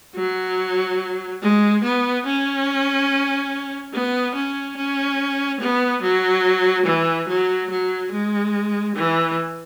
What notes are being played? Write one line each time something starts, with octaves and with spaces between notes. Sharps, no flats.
F#3
G#3
B3
C#4
B3
C#4
C#4
B3
F#3
E3
F#3
F#3
G#3
E3